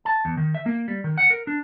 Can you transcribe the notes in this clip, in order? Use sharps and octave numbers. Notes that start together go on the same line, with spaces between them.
A5
E2
D#3
E5
A#3
G3
D#3
F#5
A#4
D4